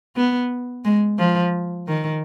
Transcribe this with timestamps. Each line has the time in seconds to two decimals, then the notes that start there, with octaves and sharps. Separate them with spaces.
0.16 B3
0.84 G#3
1.19 F3
1.88 D#3